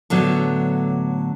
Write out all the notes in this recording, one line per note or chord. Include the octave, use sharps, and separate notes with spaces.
A2 D3 F#3 B3